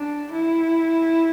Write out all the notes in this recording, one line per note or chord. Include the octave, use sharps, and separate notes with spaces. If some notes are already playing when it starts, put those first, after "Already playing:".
Already playing: D4
E4